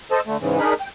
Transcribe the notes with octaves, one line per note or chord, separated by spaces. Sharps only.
A4 C5 D#5 A5
D3 A3
G#2 C#3 E3
D4 D#4 G#4 A#4 B5
G5